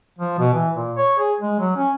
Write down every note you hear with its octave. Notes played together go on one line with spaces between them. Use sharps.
F3
B2
E3
A#2
C#5
G#4
G#3
F#3
C#4